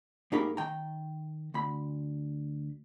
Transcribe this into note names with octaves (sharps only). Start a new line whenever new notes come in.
G#2 A#3 D#4 G4 A#4 B5
D#3 G5 A#5
D2 B5